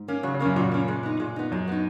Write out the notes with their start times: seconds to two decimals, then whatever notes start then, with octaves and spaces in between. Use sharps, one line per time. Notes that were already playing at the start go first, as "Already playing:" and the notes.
Already playing: G#2
0.08 A#3 C#4
0.23 C#3 F#3
0.34 C#3
0.40 F#2 A#3 C#4
0.56 A#2 F#3
0.71 A#3 C#4
0.88 G#3
1.03 B3 D#4
1.20 A#2 G#3
1.36 B3 D#4
1.52 F#2 G#3
1.68 B3 D#4